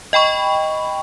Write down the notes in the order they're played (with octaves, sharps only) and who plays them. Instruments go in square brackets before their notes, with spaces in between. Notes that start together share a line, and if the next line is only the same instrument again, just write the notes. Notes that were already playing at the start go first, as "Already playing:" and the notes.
[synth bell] D#5 G5 B5 C#6